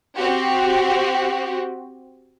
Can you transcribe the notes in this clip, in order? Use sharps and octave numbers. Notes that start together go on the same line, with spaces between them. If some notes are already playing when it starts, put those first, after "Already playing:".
C4 F#4 G4